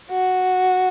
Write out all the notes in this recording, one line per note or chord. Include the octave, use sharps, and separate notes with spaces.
F#4